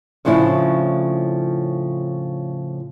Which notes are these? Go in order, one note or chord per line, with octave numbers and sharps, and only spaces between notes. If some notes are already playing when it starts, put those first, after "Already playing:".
A2 C#3 F3 D4 E4